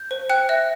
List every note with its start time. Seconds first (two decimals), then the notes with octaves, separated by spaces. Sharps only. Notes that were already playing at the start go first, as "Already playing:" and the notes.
Already playing: G6
0.11 C5
0.30 G5 F#6
0.49 E5 F#6